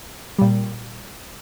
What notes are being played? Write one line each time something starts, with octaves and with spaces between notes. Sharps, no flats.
A#2 G3